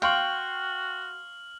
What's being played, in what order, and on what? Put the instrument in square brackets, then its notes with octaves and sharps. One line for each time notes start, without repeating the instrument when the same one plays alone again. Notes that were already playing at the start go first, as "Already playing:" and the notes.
[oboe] F#4 [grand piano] F5 C6 C#6 [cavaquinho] G5 [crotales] F6 F#7